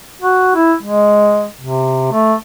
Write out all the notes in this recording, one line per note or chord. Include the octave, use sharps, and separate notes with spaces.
F#4
E4
G#3
C3
A3